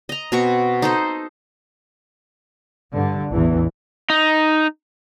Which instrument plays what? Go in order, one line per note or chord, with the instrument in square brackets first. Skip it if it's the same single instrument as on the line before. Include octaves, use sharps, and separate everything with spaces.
[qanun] D#5 A#5
B2 C4 F#4 C#6
D#4 A4 C5
[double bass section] G2 D3
A1 E2 E3
[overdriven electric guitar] D#4